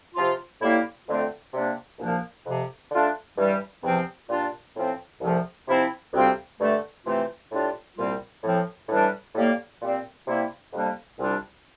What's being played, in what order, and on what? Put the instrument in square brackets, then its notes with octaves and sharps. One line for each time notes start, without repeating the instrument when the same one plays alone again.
[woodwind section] C3 F3 C4 F4
A2 G3 A#3 E4
F2 D3 A3 C4 F4
C3 G3 A#3 D4
C2 A#2 F3 A#3 D4
F2 C3 F3
D3 A3 D4 F4
G2 E3 G3
E2 C3 F3 C4
A#2 G3 D4 F4
A2 F3 C4
C2 C3 F3 A3
C3 F3 C4 E4
D2 C3 G3 C4 F4
G2 D3 A3
C3 E3 A3 C4 F4
A2 G3 D4 F4
C2 A#2 G3 C4 F4
A2 F3 C4
A2 E3 G3 D4
A2 G3 A#3
A#2 G3 C4
C3 G3 A#3 E4
F2 C3 G3 A#3 D4
C2 C3 G3 D4 F4